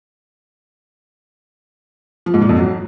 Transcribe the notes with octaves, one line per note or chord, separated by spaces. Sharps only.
F3
G#2
A#2
F2
F#3